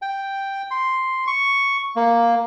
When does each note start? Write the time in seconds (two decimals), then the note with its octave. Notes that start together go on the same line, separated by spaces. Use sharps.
0.02 G5
0.71 C6
1.27 C#6
1.96 A#3